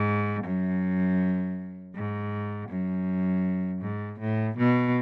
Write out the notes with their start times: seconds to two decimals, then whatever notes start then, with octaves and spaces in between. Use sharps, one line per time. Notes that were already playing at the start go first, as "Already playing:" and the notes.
Already playing: G#2
0.44 F#2
1.95 G#2
2.69 F#2
3.82 G#2
4.20 A2
4.58 B2